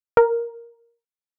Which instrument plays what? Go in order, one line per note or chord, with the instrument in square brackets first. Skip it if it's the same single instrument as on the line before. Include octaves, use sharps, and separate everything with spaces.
[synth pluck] A#4